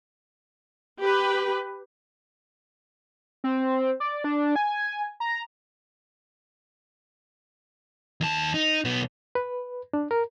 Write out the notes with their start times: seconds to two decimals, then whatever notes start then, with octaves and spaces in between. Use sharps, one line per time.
1.00 G4 B4
3.44 C4
4.00 D5
4.24 D4
4.56 G#5
5.20 A#5
8.21 D#2 A5
8.54 D#4
8.85 B1 B3
9.35 B4
9.93 D4
10.11 A#4